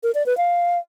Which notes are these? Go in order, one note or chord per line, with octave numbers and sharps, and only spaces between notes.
A#4
D5
B4
F5